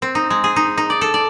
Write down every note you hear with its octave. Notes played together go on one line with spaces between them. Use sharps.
C4
D#4
G#3
G#4
D#4
D#4
D5
A4
D5